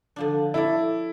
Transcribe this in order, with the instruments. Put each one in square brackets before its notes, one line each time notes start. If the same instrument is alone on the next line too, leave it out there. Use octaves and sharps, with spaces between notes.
[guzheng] D3 F3 D4
[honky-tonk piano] E4 [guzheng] A4 C#5 D5